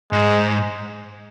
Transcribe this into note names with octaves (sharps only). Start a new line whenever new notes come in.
G#2 G#3